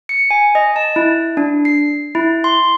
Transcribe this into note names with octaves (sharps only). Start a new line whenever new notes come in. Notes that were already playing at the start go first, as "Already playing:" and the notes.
C#7
G#5
D#5
A5
E4
D4
C7
E4
C6